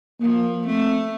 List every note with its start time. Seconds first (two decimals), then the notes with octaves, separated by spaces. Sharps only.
0.21 F3 A#3
0.66 A3 C4